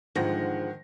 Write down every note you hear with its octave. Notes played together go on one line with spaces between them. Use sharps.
G#2 D3 D#3 F3 F#5 G5 A#6